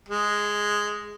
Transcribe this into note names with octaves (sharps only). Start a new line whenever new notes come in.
G#3